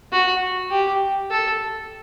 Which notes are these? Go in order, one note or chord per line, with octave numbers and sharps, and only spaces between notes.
F#4
G4
A4